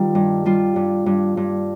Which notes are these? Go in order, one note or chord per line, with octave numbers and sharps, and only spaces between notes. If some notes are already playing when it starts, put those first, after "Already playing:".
Already playing: D#3 G3 F4
G2
G3 F4
G2
G2
G2